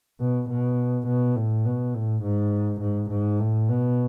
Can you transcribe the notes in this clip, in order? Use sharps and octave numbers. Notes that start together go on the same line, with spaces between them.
B2
B2
B2
A2
B2
A2
G#2
G#2
G#2
A2
B2